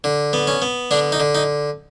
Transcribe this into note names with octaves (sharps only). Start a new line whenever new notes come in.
D3
B3
C#4
B3
D3 D4
D#4
D3
D#4